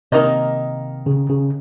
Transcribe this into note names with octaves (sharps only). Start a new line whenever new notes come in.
C3 D#3 A#3 D#4 A#4 D#5
C#3
C#3